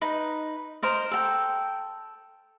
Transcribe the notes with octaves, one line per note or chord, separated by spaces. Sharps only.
D#4 B4
A#4 C5 D#5
A4 G5